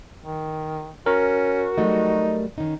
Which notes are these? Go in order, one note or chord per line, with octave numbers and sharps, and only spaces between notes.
D#3
C#4 F#4 A#4
F#3 G3 A3 D#4
D#3 C#4 D#4